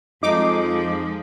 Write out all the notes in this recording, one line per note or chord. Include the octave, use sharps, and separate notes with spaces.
F2 F3 G#3 D#4 D6